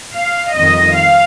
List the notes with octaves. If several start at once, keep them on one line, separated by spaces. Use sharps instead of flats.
F5
F2 D#3 G3 D#5
F5